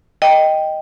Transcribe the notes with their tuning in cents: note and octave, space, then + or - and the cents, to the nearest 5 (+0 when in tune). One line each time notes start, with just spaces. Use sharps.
D#5 +0 G5 +0